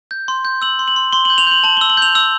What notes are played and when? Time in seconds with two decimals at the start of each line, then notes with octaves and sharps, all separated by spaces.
0.11 G6
0.28 C6
0.45 G6
0.62 E6 F#7
0.79 C6
0.88 F#7
0.96 C6
1.13 C6 G7
1.25 F#7
1.30 G6
1.38 F7
1.47 G6 F#7
1.64 A5 F#7
1.77 G7
1.81 E6
1.90 F#7
1.97 G6 F7
2.15 E6